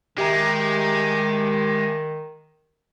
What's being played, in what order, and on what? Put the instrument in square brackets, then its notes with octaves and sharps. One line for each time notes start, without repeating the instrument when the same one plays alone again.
[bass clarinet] D#3 [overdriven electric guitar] G#3 [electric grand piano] G4 E5 A#5